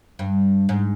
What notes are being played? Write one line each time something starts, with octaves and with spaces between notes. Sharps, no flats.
G2
G#2